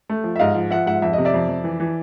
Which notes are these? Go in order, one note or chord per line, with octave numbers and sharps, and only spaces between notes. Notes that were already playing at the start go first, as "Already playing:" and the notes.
A3
F3
E5
G#2 D#5 F5
F3
F3 E5 F#5
G#2 E5 F#5
F2 E5
C3 D#5
D5 E5
F2
F2
E3
E3